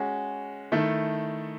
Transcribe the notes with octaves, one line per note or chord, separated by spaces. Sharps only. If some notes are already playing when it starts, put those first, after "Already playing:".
Already playing: G#3 C#4 F#4
D#3 A3 E4 A4